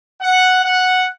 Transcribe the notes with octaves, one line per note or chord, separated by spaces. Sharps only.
F#5
F#5